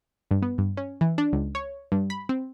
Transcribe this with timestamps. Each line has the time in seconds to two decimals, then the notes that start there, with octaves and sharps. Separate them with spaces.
0.31 G2
0.42 B3
0.58 G2
0.77 C#4
1.01 E3
1.18 D4
1.33 C#2
1.55 C#5
1.92 G2
2.10 B5
2.29 C4